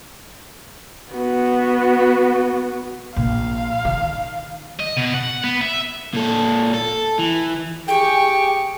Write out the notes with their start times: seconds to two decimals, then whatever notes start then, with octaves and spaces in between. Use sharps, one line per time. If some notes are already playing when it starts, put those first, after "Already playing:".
1.13 B3 F#4
3.16 A#1 F5
3.85 D#3
4.80 D#5
4.97 B2
5.14 F#5
5.44 B3
5.62 E5
6.14 A#2 A4
6.73 A4
7.19 E3
7.88 G4 G#4 G5 C#6